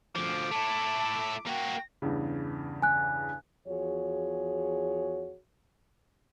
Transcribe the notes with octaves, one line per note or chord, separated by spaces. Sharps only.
D2 F3 D6
A3 E4 A5
A#3 F#4 G5
E2 G2 C#3
G#5 F#6
E2 F3 F#4 G#4 C#5